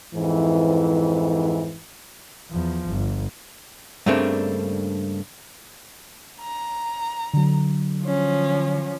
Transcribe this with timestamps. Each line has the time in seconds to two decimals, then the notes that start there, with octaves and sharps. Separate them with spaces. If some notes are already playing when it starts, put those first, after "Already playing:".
0.15 F2 G#2 E3
2.51 E2 F3
2.88 G1
4.06 G2 C#3 A3 A#3 C4 D4
6.41 A#5
7.33 D3 F#3
8.03 F3 C#4